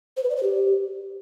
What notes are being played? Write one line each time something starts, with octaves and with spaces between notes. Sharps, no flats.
C5
B4
D5
C5
G4